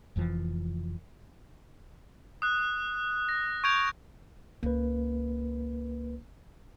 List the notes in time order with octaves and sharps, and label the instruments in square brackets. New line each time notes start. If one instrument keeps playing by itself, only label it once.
[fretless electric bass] F1 F2 E3 F3
[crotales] D#6 F#6
A#6
C#6 G6 G#6 D7 F7
[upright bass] C#2 [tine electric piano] A#3 B4